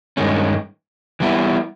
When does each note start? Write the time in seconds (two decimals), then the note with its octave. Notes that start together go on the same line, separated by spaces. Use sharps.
0.17 G2 D#3 G#3 C#4
1.20 E3 G3 B3 E4